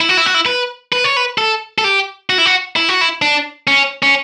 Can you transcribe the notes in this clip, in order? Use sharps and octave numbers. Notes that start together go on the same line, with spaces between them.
E4
F#4
E4
F#4
E4
B4
B4
C#5
B4
A4
A4
G4
F#4
E4
F#4
E4
F#4
E4
D4
C#4
C#4